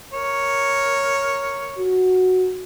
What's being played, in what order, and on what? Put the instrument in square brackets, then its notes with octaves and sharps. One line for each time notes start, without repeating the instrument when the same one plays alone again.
[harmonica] A#4 C#5
[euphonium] F#4